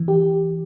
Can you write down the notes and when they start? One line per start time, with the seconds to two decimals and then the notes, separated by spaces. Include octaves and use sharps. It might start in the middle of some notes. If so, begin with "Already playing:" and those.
Already playing: E3
0.08 G4